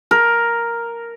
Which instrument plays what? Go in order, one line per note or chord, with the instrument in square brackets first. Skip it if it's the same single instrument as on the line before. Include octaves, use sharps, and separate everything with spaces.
[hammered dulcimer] A#4